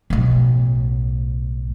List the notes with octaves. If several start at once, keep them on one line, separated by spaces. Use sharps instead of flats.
B1 A2